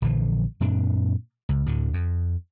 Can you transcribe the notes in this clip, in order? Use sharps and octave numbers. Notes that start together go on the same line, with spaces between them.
A#1 D3 E3 F3
F#2 A#2 C4 D4
C#2
D2 A2 D3
F2